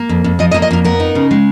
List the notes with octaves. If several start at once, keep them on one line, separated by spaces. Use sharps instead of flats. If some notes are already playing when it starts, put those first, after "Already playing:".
Already playing: A#3
F2
F2
F3 D#5
D#5
A#3
D#5
F2 A#4
B3 A#4
D#4
C#3
G#3